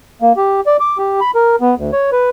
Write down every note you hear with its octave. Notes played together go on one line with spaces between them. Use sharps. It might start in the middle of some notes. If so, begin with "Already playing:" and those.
A#3
G4
D5
D6
G4
B5
A#4
B3
D2
C#5
B4